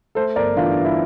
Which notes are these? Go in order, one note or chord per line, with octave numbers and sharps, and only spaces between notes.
A3 A4 C5
G1 A#4 D5
E3 D4 F4
D4
G2
E4